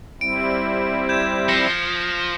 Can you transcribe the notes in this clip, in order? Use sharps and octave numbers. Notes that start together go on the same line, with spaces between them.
G3 C4 E4 D7
G6 G#6 E7
F3 A#6 B6 C#7